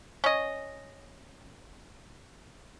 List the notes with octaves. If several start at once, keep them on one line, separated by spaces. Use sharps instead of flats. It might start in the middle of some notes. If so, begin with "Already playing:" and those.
C#4 D#5